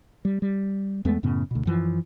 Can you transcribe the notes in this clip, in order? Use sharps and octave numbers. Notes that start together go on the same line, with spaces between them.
G3
G3
E2 G#3 A3 B3
F#2 A2 C#3 B3
D2 B2
F#2 E3 F3